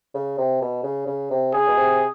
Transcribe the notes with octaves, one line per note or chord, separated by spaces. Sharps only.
C#3
C3
B2
C#3
C#3
C3
C#3 G#4
B2
C3